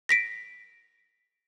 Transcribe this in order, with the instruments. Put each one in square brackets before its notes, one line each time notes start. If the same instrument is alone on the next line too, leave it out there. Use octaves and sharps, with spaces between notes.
[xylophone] A#6 B6 D7